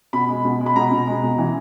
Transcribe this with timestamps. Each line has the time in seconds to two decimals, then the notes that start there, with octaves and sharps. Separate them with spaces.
0.13 B2 B5
0.29 G#3
0.45 B2
0.61 G#3
0.66 B5
0.76 B2 A#5
0.92 B2
1.07 G#3
1.23 B2
1.38 E3